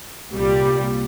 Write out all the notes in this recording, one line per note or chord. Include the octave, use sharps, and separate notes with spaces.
C2 A#2 G3